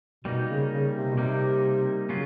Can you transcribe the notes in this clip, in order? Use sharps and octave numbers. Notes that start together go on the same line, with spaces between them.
B2 G3 A#3 D#4
C#3
C#3
C3
B2
C3 G3 A#3 D#4
C#3 F#3 C#4 F4